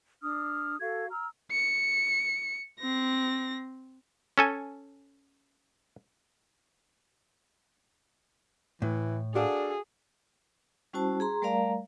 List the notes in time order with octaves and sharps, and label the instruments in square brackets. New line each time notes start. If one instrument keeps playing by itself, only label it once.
[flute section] D4 D#6 F6
F#4 A4 F5 G#6
A#5 E6 F6
[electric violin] C#7
C4 A#6
[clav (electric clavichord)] C#4 A4 G#5
[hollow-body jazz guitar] A2 [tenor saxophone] E3
[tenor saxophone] D4 [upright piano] F#4 A4 F5 [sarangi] G#4
[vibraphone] G3 C#4 E4 F#4 C5 A5
G#4 A#5 C6
G3 A3 A#4 D5 F5 A#5